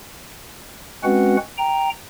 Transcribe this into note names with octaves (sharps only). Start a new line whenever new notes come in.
G#3 C4 C#4 F#4 B4 F#5
G5 A#5